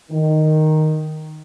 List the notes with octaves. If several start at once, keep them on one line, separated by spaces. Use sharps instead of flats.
D#3